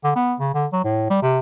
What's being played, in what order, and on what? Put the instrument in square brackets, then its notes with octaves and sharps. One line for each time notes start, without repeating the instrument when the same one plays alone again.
[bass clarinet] D3
B3
C#3
D3
F#3
A2
G3
C3